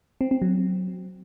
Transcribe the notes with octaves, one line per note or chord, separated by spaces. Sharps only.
C4
C4
F#3